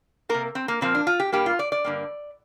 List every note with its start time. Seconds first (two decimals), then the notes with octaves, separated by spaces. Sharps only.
0.29 C3 A#3 A#4
0.55 C4
0.68 A#3
0.81 A#2 F3 A#3 C4
0.95 D4
1.07 F4
1.20 G4
1.32 G2 G3 A#3 G4
1.46 F4
1.59 D5
1.72 D5
1.84 G2 D3 A#3